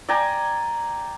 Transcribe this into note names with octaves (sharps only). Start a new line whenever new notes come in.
D5 G5 G#5 A#5